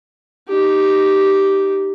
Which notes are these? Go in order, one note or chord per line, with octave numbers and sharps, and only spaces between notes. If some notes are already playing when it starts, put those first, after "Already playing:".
D#4 G4